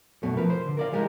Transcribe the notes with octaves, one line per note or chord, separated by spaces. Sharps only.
F#2 B2 A3
F3 A#4 B4
C5
D3
A#4 D5 F5
E3 G3 G#3 G4 A#4